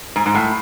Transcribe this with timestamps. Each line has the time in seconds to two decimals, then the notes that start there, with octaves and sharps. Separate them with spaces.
0.16 G#2
0.26 G#2
0.35 A2